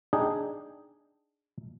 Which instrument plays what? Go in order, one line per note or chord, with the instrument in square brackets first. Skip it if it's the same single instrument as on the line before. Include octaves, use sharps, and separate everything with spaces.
[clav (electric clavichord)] D4 D#4 G#4 G5